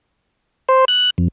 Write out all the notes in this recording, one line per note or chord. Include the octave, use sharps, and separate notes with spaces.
C5
F#6
F2